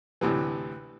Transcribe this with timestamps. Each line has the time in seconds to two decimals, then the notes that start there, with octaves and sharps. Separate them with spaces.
0.21 D2 A2 C3 E3